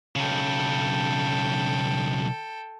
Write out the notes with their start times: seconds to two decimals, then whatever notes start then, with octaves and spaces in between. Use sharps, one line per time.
0.16 B1 C#3 A4 G5